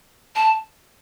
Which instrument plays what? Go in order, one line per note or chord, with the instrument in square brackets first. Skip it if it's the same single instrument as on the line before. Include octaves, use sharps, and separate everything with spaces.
[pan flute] A5